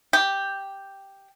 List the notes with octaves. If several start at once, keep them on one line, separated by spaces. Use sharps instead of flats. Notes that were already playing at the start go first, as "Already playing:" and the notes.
G4